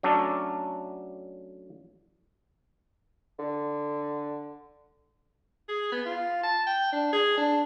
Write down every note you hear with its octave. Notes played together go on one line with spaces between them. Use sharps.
F#3 A3 C#4 D4 A4
D3
G#4
B3
F4
A5
G5
D4
G#4
D4